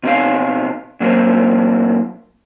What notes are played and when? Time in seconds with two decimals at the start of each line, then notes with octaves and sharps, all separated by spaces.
0.03 B2 C4 D#4 F5
1.00 A#2 F#3 A#3 C4